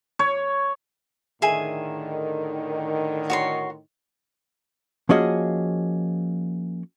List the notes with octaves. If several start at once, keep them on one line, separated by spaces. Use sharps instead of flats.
C#5
A2 D3 D#3 G#4 E5 G#5
F#4 C#5 C6
F3 A#3 C#4 F#4 G#4 D#5